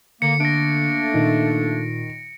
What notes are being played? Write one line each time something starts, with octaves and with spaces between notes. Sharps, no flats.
D3 A#3 C#7
A3 A#3 D4 A#6 D7
A#2 D#3